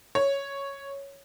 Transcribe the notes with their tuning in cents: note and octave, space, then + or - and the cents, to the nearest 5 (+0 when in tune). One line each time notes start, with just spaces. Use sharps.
C#5 +0